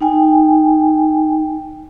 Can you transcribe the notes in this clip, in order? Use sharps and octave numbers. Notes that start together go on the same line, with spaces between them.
D#4 G5 G#5